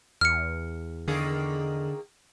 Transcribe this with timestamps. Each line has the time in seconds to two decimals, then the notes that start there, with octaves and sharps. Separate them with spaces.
0.21 E2 F6 C#7
1.08 D3 D#3 A#3 G#4